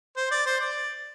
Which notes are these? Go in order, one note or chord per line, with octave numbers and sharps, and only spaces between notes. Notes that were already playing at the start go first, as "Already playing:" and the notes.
C5
D5
C5
D5